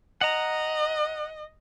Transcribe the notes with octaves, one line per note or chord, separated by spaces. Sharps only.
D#5 F#5 A#5